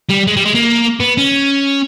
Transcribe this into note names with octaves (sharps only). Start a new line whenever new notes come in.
G3
G#3
G3
G#3
A#3
B3
C#4